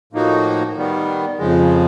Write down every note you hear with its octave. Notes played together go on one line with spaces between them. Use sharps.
A2 F3 A#3 D#4 F#4
D#3 G3 B3
F2 C#3 F3 G#3